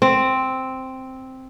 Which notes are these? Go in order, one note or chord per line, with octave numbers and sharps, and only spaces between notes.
C4